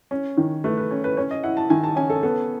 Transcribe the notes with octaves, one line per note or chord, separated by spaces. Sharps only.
C#4
D#3
A3 B4
B4
C#4 C#5
B4
C#4 C#5
D#5
E4 F#5
A5
D#3 G#5
A5
C#4 G#5
A4
B3 A4